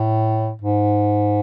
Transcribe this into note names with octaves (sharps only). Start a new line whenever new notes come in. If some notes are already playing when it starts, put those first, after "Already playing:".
Already playing: A2
G#2